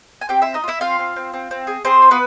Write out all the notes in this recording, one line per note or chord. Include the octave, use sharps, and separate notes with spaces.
G#5
C4 G4 G5
E4 F4 E5
D#4 D#5
F4
E4 E5
C4 F4 F5
C4
C4
C4
C4
G#4
C4 G#4 C5
F4
B3 B4